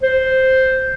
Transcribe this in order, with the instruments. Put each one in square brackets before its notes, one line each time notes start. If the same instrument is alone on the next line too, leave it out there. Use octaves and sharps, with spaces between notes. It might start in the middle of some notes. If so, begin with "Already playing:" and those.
[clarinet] C5